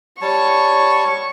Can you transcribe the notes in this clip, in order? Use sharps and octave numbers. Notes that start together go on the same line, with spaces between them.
G3 C#5 A5 C#6